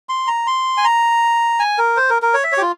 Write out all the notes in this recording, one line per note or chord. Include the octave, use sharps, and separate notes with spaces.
C6
A#5
C6
G#5
A#5
G#5
A#4
C5
A#4
A#4
C#5
E5
C#5
G4
F4